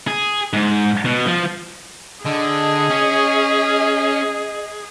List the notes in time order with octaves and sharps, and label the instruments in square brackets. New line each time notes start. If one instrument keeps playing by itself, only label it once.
[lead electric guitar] G#4
G#2
B2
F3
[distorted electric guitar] D3 [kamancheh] G#4 [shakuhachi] D#5
[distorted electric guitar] C#4